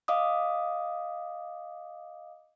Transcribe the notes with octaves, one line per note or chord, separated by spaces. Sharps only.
D#5 F5 D6 D#6